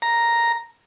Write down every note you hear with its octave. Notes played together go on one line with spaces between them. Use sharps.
A#5